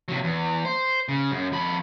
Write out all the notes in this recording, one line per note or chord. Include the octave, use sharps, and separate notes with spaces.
C3 F#3
E2
C5
C#3
F#2
F2 B5